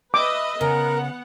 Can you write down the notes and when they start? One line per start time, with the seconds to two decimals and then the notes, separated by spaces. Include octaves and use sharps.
0.14 B4 D#5 E5 D6
0.61 C#3 B3 A#4 F#5